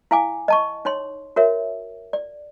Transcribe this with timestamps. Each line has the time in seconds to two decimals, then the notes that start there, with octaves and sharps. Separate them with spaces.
0.11 E4 F5 G#5 D6
0.48 D#5 A5 C#6
0.85 D#4 C#5 C6
1.36 F#4 A#4 C#5 E5
2.13 D5